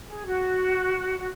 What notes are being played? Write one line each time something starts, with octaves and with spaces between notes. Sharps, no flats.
G#4
F#4
F#4